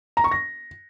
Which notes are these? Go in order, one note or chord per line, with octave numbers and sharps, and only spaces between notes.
A#5
C#6
A#6